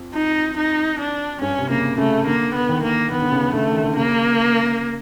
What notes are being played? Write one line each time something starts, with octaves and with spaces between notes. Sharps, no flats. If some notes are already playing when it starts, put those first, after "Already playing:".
Already playing: F2
D#4
D#4
D4
G2 C#4
C3
C#3 A#3
C#3 A3
D3 A#3
B3
D#3
A#3
D#3 B3
D3
C#3
D3
D3 A3
D#3
D3
C#3 A#3